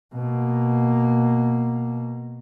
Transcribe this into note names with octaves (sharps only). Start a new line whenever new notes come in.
B2 A#3